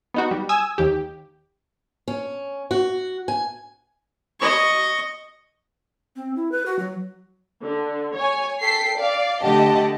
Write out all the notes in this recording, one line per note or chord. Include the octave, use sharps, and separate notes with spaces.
B3 D#4 F#4
G3
G#5 D#6 E6
D#2 G4
C#4
F#4
G#5
D#5 C#6
C4
E4
B4
F#4
F#3
D3
C#5 G#5
A4 G5 B6 C7
D5 F5
D3 A3 G4 D#5 F#5 A5